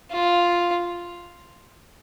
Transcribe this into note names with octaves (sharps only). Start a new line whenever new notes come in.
F4